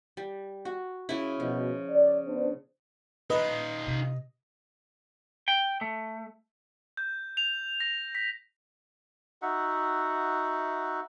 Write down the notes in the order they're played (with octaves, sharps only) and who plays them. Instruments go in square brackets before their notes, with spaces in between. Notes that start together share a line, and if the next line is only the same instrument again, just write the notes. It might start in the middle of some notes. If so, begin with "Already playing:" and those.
[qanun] G3
F#4
C#3 E4
[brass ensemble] B2 [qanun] F3
[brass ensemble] D5
B3 D4 C5
[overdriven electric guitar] D#3 F4 [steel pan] B4 [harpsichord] D#5
[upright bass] C3 C4
[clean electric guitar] G5
A3
[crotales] G6
F7
A#6
B6
[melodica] D#4 F#4 E5 F#5